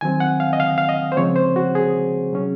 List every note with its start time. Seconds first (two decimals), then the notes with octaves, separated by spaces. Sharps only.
0.01 D#3 F#3 C4 G#5
0.20 F#5
0.40 F5
0.53 D#5
0.60 F5
0.78 F5
0.89 D#5
1.12 C5
1.17 C#3 F3 G#3 C4 C#5
1.36 C5
1.56 F#4
1.75 G#4
2.32 C3 F#3 C#4